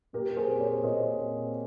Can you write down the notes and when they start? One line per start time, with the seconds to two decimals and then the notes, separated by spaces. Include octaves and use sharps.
0.13 A#2 G4 A#4
0.37 G#4 C5
0.48 C4
0.60 A#4 C#5
0.83 A#2 C5 D#5
1.19 C4